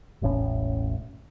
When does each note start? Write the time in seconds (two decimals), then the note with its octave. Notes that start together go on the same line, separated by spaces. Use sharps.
0.22 E1 A1 A2 C#4